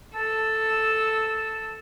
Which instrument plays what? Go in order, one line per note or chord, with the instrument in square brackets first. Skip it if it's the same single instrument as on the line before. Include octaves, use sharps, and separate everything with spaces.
[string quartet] A4 E6 [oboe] A5